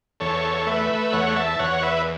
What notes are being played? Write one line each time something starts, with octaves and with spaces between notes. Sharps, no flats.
E2 A4 C#5
A3 B4 E5
E2 C#5 F#5
E5 A5
E2 C#5 F#5
B4 E5